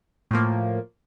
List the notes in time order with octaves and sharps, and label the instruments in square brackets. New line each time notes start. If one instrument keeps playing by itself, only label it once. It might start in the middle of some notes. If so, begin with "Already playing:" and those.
[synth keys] A2 F3 A#3